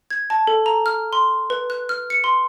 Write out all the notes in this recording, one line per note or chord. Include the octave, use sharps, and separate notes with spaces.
G#6
A5
A4
A#5
F6
C6
B4
F#6
F6
C#7
C6